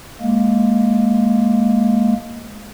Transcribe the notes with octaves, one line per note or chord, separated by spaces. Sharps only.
G#3 A#3